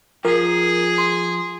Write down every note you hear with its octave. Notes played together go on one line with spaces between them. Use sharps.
F3 G#4 A#4
C6